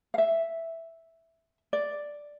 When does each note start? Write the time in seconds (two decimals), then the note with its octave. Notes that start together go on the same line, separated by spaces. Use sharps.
0.14 F5
0.18 E5
1.73 D5